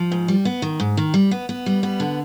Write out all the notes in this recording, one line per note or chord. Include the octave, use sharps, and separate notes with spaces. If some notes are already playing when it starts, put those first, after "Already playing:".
Already playing: F3
G#2
G3
B3
D#3
G#2
D#3
G3
B3
B3
G3
B3
D3